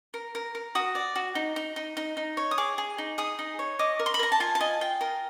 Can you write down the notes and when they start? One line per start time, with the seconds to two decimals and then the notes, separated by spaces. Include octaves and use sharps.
0.14 A#4
0.35 A#4
0.55 A#4
0.75 F#4 D#6
0.95 D5
1.15 F#4
1.35 D#4
1.56 D#4
1.76 D#4
1.97 D#4
2.17 D#4
2.37 C#5
2.51 D#6
2.58 G#4 D6
2.78 G#4
2.98 D#4
3.18 G#4 D#6
3.39 D#4
3.59 C#5
3.79 D#5 D6
3.99 A#4
4.06 C6
4.14 B5
4.19 A#4 A#5
4.32 A5
4.40 F4 G#5
4.55 A5
4.60 D#5 G#5
4.81 F4 G5
5.01 A#4